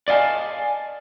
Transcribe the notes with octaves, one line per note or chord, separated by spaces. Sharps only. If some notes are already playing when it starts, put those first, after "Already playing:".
D5 D#5 F5 G#5 A5